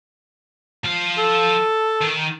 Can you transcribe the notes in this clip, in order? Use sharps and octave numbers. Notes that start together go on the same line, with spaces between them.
F3 F5
A4
D#3